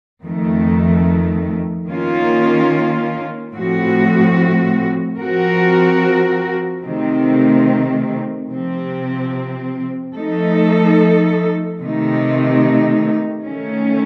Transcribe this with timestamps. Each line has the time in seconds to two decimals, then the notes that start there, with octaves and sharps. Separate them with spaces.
0.22 F2 D#3 A3
1.87 D#3 A#3 C#4 F4
3.53 A2 F3 A3 C4 F#4
5.18 F3 C4 F#4 A#4
6.84 C3 D#3 A3 C4
8.50 C3 F3 C4
10.16 F3 A3 D#4 A4
11.81 C3 D#3 A3 D#4
13.46 D#3 A3 C#4